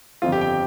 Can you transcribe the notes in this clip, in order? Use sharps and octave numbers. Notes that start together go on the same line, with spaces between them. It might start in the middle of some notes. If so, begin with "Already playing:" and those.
G1 F2 F3 C4 F4
G4
G5